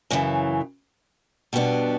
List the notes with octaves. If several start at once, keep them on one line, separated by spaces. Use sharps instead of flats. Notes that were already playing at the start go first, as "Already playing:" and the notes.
F#2 C#3 E3
B2 G3 B3 D4